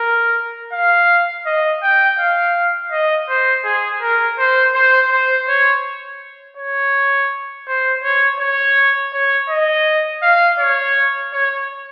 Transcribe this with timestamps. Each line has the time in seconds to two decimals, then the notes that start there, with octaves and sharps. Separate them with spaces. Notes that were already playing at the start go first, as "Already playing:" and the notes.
Already playing: A#4
0.73 F5
1.46 D#5
1.83 G5
2.19 F5
2.92 D#5
3.29 C5
3.65 G#4
4.02 A#4
4.38 C5
4.75 C5
5.11 C5
5.49 C#5
6.58 C#5
7.68 C5
8.04 C#5
8.40 C#5
9.14 C#5
9.50 D#5
10.23 F5
10.60 C#5
11.33 C#5